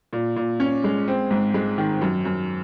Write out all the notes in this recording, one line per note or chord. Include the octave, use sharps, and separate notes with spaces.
A#2
A#2
C#4
G#3
C4
G#2
G#3
D#3
F#2
F#2